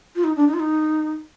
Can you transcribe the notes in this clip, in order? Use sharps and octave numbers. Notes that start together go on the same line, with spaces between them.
F4
D#4
D4
D#4
F4
D#4